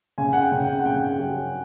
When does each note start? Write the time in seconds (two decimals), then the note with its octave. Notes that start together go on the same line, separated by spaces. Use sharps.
0.18 C#3 G#5
0.33 F#5
0.41 G5
0.52 C#3
0.63 G5
0.79 F#5
0.85 C#3 G5
1.19 F#3